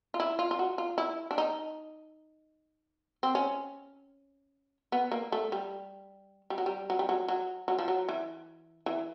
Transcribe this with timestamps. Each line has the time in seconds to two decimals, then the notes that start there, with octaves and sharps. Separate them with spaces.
0.14 F4
0.20 E4
0.39 F4
0.51 F4
0.59 F#4
0.78 F4
0.98 E4
1.31 D4
1.38 D#4
3.23 C4
3.35 C#4
4.92 B3
5.11 A#3
5.32 A3
5.52 G3
6.50 G3
6.58 F#3
6.66 G3
6.90 F#3
6.99 G3
7.09 F#3
7.28 F#3
7.68 F#3
7.79 F3
7.88 F#3
8.09 E3
8.86 E3